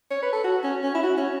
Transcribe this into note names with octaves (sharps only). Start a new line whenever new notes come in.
C#5
B4
A4
F#4
C#4
C#4
E4
F#4
C#4